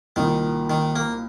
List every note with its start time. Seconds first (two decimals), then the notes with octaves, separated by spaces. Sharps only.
0.16 C2 A#2 D#3 A#3 D#4
0.70 D#3
0.96 A#3